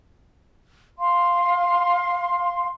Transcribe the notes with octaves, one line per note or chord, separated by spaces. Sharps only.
F5 C6